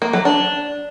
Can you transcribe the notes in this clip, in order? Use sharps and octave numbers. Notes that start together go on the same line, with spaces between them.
A#3
F#3
D4